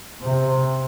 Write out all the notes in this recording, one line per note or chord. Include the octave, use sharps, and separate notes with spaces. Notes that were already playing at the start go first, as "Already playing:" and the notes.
C3